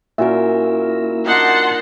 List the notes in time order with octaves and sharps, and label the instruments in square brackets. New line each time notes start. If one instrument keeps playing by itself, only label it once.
[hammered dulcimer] A#2 C#4 A#4 [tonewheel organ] A#3 E4 E6 [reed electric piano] F#4 E5
[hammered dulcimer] D4 D#4 A#4 [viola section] F#5 A5 C6